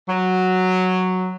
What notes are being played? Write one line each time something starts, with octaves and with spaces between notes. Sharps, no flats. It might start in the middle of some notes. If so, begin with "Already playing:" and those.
F#3